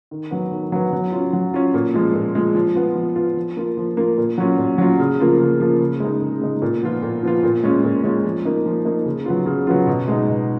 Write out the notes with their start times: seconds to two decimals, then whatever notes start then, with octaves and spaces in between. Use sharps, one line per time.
0.11 D#3
0.31 F#3 B3
0.52 D#3
0.72 F#3 B3
0.93 F#3
1.12 C#4 F4
1.33 F#3
1.54 C#4 F4
1.74 A#2
1.94 F3 G#3
2.14 A#2
2.35 F3 G#3
2.55 F3
2.75 B3 F4
2.95 F3
3.16 B3 F4
3.37 F3
3.57 A#3 F4
3.77 F3
3.97 A#3 F4
4.18 A#2
4.38 F#3 C#4 F4
4.59 A#2
4.78 F#3 C#4 F4
4.99 C#3
5.20 F3 A#3 F4
5.40 C#3
5.60 F3 A#3 F4
5.80 C#3
6.00 G#3 D#4
6.22 C#3
6.42 G#3 D#4
6.62 A#2
6.82 F3 B3 F4
7.02 A#2
7.23 F3 B3 F4
7.44 A#2
7.63 G#3 C#4 F4
7.84 A#2
8.04 G#3 C#4 F4
8.25 F3
8.45 A#3 D#4
8.66 F3
8.85 A#3 D#4
9.05 C#3
9.26 F#3 B3 F4
9.46 C#3
9.67 F#3 B3 F4
9.87 B2
10.08 G#3 D#4
10.28 B2